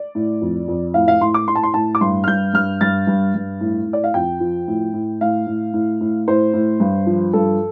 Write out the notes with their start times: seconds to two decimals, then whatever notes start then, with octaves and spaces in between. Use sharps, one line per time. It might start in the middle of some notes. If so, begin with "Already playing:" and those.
Already playing: D5
0.15 A2
0.41 F2
0.68 F2
0.94 A2 F5
1.08 F5
1.21 A2 C6
1.34 D6
1.48 A2 C6
1.55 A5
1.63 C6
1.74 A2 A5
1.95 D6
2.01 G2 C6
2.24 F6
2.27 G2 G6
2.54 G2 F6
2.81 G2 A6
3.07 G2
3.35 G2
3.61 A2
3.87 A2
3.93 D5
4.04 F5
4.14 F2 G5
4.40 F3
4.68 A2
4.94 A2
5.21 A2 F5
5.47 A2
5.74 A2
6.01 A2
6.28 A2 C5
6.54 A2
6.80 G2
7.06 F3
7.33 G2 A4